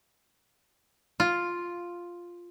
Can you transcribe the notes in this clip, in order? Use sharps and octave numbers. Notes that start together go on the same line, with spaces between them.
F4